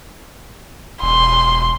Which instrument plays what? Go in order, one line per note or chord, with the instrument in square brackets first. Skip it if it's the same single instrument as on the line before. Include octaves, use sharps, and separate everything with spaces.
[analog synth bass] E1 [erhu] C6